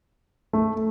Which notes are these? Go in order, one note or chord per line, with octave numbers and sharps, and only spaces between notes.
A3